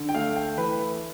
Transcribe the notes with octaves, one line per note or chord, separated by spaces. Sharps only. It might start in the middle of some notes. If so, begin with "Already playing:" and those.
Already playing: D3
G5
A3 F5
G5
E3 B4